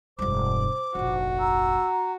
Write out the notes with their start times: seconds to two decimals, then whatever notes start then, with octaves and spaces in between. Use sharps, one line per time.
0.19 E1 G2 C5 D6
0.95 F1 A#1 F#4
1.40 A#5 E6